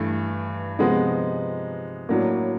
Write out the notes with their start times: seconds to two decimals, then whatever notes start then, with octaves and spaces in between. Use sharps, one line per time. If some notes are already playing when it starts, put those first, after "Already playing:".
Already playing: G2 E3 A3
0.79 C3 F3 G#3 B3 D#4
2.09 A2 F#3 A#3 D4